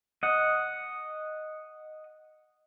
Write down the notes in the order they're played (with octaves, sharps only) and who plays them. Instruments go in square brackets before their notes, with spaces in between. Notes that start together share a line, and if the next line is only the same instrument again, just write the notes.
[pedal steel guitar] D#5 F#5